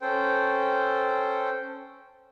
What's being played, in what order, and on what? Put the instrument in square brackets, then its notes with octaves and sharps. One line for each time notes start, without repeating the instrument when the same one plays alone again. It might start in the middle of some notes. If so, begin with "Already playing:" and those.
[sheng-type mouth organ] C#4 A4 C5 G5